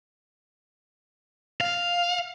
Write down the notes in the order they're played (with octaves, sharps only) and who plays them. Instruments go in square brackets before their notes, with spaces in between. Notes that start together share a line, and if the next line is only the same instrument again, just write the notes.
[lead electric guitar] F5